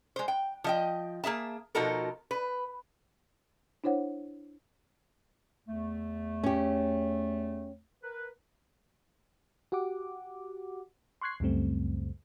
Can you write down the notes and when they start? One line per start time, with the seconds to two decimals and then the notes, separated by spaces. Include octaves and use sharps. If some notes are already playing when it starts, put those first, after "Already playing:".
0.16 G#3 C5
0.28 G5
0.64 F3 D#5 G5
1.24 A#3 G#4 E5 A5
1.75 B2 F3 D#4 F#4 A4 A#4
2.31 B4
3.84 D4 E4 C5 C#5 F#5
5.68 E2 A3
6.44 C#4 G4
8.03 A#4 B4
9.72 F#4 G4 F#5 D6
11.21 C6 C#6 F#6 G#6 C7
11.40 C#2 F#2 C#3 G3 A3 C4